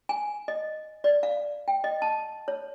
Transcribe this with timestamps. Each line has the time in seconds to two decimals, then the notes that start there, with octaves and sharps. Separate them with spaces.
0.09 G#5
0.48 D#5
1.04 D5
1.23 F5
1.68 G5
1.84 D#5
2.02 A5
2.48 C#5